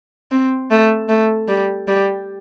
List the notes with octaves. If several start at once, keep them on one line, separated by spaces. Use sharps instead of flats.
C4
A3
A3
G3
G3